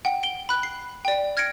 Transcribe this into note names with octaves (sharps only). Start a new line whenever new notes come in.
F#5 G5
D7 G7
B5 F#6
C7
D5 G5
F6 G#6 A#6 C#7 D7